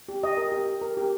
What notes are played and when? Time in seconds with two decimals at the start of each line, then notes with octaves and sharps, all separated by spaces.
0.09 G4
0.23 G4 D#5
0.37 A#4
0.52 G4
0.67 G4
0.81 A#4
0.97 G4